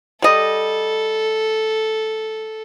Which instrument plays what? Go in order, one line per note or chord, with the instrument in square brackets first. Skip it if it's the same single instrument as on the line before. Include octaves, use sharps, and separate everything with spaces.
[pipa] G3 D#5 [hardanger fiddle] A4